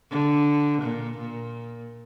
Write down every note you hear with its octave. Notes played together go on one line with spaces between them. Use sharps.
D3
A#2
A#2